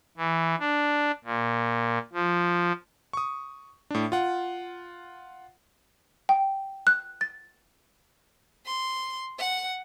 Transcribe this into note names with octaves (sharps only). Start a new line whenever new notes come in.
E3
D4
A#2
F3
C#6 D#6
A2 D4
F4 F#5
G5
F#6
A6
C6
F#5